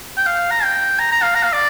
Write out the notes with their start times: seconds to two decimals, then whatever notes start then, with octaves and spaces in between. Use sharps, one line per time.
0.17 G5
0.26 F5
0.51 A#5
0.63 G5
0.99 A#5
1.11 A#5
1.22 F5
1.35 A#5
1.44 F5
1.53 D5